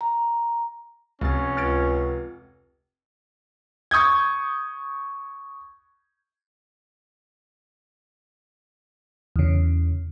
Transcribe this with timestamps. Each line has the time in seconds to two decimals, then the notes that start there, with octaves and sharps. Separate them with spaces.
0.01 A#5
1.21 F1 C#2 C#4 A6
1.57 C#2 F6 A6 D7
3.91 C#6 D#6 G6 G#6
9.36 E2 C#3